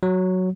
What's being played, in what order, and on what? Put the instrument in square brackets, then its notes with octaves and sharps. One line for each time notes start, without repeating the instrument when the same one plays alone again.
[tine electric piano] F#3